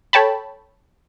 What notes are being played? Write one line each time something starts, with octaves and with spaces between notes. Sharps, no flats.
A4 C#5 G5 A5 B5